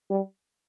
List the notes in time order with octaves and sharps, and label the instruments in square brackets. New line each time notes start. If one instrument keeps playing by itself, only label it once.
[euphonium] G3